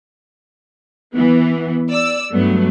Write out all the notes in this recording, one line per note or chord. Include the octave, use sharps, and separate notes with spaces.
E3 B3
D5 E6
G2 F#3 A3 B3